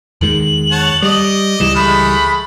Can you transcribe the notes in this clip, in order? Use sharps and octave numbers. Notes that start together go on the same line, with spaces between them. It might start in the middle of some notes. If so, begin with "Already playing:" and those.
E2 D#3 G#3 F#7
C#5 F#5 A5
G3 D5 D#5 D#6
C#2 E3 G3 E7
G#3 A3 B5